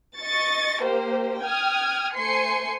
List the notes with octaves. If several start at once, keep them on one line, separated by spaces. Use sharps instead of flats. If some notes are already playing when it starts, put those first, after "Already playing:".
D#5 C#6 A6
A#3 G4 C5
G5 D#6 F6 G#6
A3 C5 G#5 C6 C7 C#7